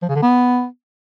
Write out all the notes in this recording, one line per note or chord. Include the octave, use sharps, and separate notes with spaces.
F3
C#3
D3
B3